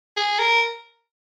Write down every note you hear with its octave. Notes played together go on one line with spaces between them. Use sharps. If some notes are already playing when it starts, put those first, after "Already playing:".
G#4
A#4